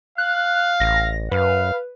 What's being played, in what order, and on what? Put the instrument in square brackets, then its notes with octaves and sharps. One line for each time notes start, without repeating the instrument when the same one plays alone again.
[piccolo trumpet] F5 [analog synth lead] F#6
[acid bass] A1 [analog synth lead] A#6
[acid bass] F#2 [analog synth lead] B4 [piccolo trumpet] F5